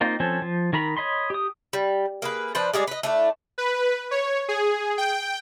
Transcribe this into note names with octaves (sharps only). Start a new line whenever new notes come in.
A#3 C4 D#4 F4
F3 C4 C#4 A4
F3
D#3 A#4 A#5 B5
C#5 D#5 B5 C6
G4 D#6
G3
A#3 G#4 B4
F3 D4 B4 C5
G3 G#3 G#4 D5
B4 D#5
A3 D4 E4
B4
C#5
G#4
G5